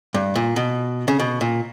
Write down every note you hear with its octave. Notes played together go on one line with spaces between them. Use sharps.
G2
A#2
B2
C#3
B2
A#2